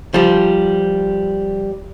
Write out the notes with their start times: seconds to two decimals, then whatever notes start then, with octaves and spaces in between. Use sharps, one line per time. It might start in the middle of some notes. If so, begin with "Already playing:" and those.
0.14 F3 G3